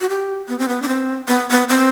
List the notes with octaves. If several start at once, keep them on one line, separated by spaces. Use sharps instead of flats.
F#4
G4
B3
C4
B3
D4
C4
B3
B3
C4